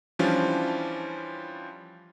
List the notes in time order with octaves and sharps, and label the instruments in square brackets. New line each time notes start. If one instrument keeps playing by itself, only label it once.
[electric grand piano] E3 F3 G3 C#4 D4 F4